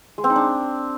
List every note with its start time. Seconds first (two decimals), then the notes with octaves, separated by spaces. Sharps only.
0.18 G#3
0.24 C4
0.30 D#4
0.36 D4